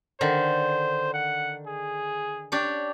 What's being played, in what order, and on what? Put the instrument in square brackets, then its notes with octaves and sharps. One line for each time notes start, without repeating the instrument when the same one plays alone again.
[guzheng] D3 D#3 [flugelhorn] C5
[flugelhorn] F#5
G#4
[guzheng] D4 G4 C#5